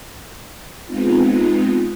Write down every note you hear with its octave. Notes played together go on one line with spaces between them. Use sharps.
G#3 B3 C4 D#4 F4